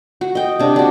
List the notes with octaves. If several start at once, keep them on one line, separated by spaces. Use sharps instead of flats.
F#4
D#5 G5
C3 D4
D4 F#4